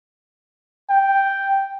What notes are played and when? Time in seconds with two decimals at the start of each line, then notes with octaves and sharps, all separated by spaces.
0.90 G5